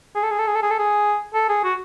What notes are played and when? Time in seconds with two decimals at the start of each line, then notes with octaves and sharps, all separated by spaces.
0.15 G#4
0.23 A4
0.31 G#4
0.39 A4
0.47 G#4
0.55 A4
0.63 G#4
0.71 A4
0.79 G#4
1.34 A4
1.49 G#4
1.64 F#4